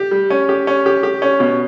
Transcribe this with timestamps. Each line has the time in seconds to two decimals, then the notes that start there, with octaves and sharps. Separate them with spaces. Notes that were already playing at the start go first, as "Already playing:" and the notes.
Already playing: G4
0.11 G3
0.30 C#4
0.49 G4
0.67 C#4
0.86 G4
1.03 G4
1.22 C#4
1.40 B2